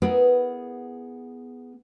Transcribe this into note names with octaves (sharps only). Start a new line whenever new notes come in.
B3 E4 G#4 A#4 B4